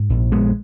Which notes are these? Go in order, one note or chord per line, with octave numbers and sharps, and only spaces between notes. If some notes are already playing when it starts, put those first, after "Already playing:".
Already playing: G#2
A#1
A#1 G#3 B3